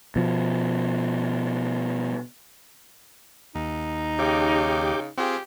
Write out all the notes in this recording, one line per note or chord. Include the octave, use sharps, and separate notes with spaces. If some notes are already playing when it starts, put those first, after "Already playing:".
B2 F3
D#2 D#4
C#3 G4 D6 G6
C4 F4 G4 G#4